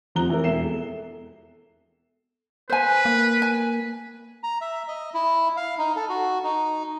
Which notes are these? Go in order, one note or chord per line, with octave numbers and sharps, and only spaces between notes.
F1 F3 A#5 F#6 G7
E3 E4 A#4
E1 E5 C7 E7
A4
B4 C5 G#5
A#3
G#5
A#5
E5
D#5
E4
F5
D#4
A4
F#4
D#4